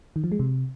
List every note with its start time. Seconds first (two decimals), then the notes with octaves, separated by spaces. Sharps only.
0.16 D#3
0.24 F3
0.32 G#3
0.39 C3